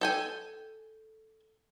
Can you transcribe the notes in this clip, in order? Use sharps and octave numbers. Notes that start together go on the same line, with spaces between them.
A4 G5 G#5